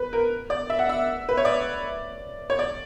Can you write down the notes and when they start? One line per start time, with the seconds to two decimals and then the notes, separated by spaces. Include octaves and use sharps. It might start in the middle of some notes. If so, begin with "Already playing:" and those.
Already playing: B4
0.13 A#4
0.50 D5
0.70 E5
0.79 F#5
0.89 E5
1.29 B4
1.37 C#5
1.45 D5
2.50 C#5
2.59 D5